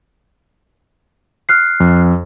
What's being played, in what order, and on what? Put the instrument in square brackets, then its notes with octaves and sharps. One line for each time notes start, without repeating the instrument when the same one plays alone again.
[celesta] F6 F#6 C7
[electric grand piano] F2